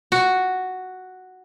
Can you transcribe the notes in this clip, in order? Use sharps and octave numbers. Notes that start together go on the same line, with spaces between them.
F#4